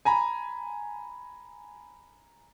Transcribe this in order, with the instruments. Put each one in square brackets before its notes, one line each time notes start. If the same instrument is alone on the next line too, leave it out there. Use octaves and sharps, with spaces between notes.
[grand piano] G#5 A#5 B5